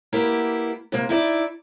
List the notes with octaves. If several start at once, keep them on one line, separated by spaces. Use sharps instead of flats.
A#3 B3 E4 G4
C3 A#3
D#4 E4 D5